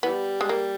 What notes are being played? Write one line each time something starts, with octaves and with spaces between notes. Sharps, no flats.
E3 G3 B3
G#3
A#3